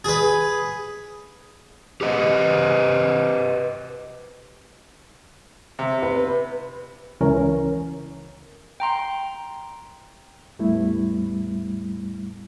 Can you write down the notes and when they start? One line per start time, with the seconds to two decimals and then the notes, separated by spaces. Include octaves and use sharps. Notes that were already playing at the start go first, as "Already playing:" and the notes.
0.04 G#4 B4
2.01 G4 B4 D#5
5.79 C3
6.02 B4
7.21 C#2 E3 C#4 A#4
8.80 G5 A#5 C6
10.59 E2 A2 G3 A3 B3 E4